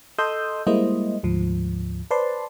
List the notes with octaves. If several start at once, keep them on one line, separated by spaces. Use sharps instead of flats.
A4 D#5 C6 D#6 E6 G6
G3 G#3 A#3 E4 C5 D#5
D2 G#2 F3
B4 C5 D5 A5 C6